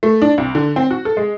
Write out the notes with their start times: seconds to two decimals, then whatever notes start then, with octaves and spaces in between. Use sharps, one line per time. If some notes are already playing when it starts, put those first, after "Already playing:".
0.03 A3
0.22 D4
0.38 C2
0.55 D3
0.76 C4
0.91 F#4
1.05 A4
1.17 G#3